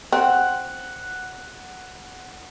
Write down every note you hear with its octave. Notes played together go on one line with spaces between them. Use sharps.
C4 F#5